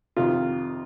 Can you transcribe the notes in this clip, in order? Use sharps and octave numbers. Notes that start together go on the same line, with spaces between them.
F2 C3 D#3 F4